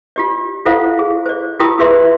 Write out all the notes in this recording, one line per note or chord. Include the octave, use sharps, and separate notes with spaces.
F4 G4 D5
E4 F4 A4 C5 F5 F#5
G#4
C5 D5
E4 F4 G4 A#4 G5 D#6
F4 G#4 B4 D5 E5 C6